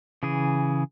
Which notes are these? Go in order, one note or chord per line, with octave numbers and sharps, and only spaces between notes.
C#3 E3 G#4